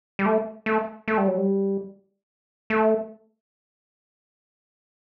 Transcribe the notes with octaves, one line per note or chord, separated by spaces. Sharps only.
G3
A3
A3
A3
G3
F#3
G3
A3